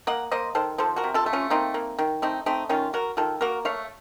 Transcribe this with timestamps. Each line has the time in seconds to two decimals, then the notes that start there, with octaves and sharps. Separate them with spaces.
0.07 A#3 D#5 F#5
0.32 A#3 C5 D#5
0.55 D#3 A4 C5
0.78 F3 A4 C5
0.96 F#4 A#4
1.04 C3
1.14 F4 A4
1.26 A3
1.33 C#4 F4
1.50 A#3 C4 D#4
1.74 A#3
1.98 D#3
2.22 A3 C4 D#4
2.46 A3 C4 D#4
2.69 D#3 C#4 F4
2.93 F#3 F#4 A#4
3.17 D#3 F4 A4
3.41 A#3 F#4 A#4
3.65 A3 C#5 F5